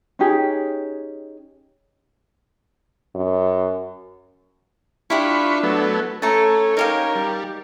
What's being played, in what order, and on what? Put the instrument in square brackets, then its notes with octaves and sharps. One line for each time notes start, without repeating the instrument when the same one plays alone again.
[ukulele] C#4 D#4 G4 G#4
[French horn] F#2
[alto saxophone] D4 [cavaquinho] E4 G4 B4 [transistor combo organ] F4 B5 C#6
[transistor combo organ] F#3 A3 B3
[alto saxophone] A3 [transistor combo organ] C#4 [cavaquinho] A5 A#5
[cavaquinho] D#4 G4 F5 [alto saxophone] A#4
[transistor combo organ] G3